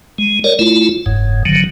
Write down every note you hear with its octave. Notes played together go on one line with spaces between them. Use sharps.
G#3
A#4 C#5 D5
A3 E4 F4
F#1 G#2
D3 D#3 F#3